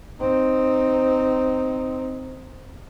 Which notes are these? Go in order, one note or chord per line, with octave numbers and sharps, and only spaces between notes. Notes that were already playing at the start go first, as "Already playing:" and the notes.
C4 D#4